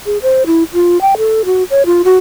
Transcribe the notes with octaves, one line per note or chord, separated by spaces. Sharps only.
G#4
C5
E4
F4
G5
A4
F#4
C#5
F4
F#4